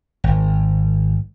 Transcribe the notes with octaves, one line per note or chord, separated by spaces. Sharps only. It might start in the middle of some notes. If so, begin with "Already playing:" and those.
G#1